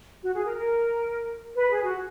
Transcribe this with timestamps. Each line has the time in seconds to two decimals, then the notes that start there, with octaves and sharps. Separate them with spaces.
0.23 F#4
0.34 G#4
0.45 A#4
0.56 A#4
1.55 B4
1.70 G#4
1.84 F#4